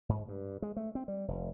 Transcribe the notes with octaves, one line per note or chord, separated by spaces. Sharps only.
G#2
G2
G#3
A3
C4
G3
F1